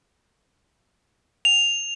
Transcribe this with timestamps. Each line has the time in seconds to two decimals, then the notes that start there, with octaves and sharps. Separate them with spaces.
1.45 F7